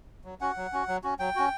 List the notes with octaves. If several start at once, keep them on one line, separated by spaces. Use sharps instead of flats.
F#3
C#4 F#4 F#5
F#3
C#4 F#4
F#3
C#4 F#4
F#3 G5
C#4 F#4